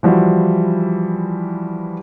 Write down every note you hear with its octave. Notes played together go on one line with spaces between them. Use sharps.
E3 F3 G3 E4 F#4